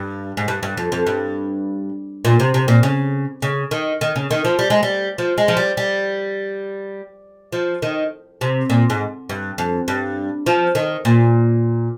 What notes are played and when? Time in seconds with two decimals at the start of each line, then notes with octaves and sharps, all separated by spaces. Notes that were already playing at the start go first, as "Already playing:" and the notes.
Already playing: G2
0.37 G#2
0.48 G2
0.63 G2
0.77 F2
0.92 F2
1.07 G2
2.25 A#2
2.40 C3
2.54 C3
2.68 A#2
2.83 C#3
3.42 C#3
3.71 D#3
4.01 D#3
4.16 C#3
4.31 D#3
4.45 F3
4.59 G3
4.70 G#3
4.83 G3
5.18 F3
5.38 G#3
5.48 F3
5.57 G3
5.77 G3
7.52 F3
7.82 D#3
8.41 C3
8.70 A#2
8.90 G#2
9.29 G2
9.58 F2
9.88 G2
10.46 F3
10.75 D#3
11.05 A#2